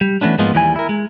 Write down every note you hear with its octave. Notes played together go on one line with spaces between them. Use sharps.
G3
E3 A3 B3 C#4 D4
G#2 F3 G#3 A#3 B3 F4
D#2 E3 G3 B4 G#5
E4 A#4
G#3